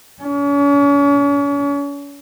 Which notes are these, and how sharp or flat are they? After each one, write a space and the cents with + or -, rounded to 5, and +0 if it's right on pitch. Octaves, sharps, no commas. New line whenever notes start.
C#4 +40